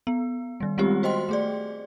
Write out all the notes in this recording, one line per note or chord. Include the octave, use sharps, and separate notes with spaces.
B3
D#3 G3
G3 G#3 B3 C4 F4 G4
F#4 C5 D#5 G5 C6
A3 G#4 D5